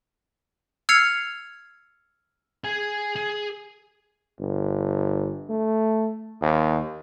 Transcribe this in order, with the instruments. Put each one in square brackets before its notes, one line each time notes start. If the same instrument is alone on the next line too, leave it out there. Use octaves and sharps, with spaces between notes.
[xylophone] E6 F6 G#6 C7 C#7 F7
[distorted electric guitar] G#4 G#5
G#4
[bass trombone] G1
A3
D#2